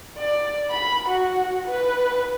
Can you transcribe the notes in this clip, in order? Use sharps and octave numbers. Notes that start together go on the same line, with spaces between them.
D5
B5
F#4
B4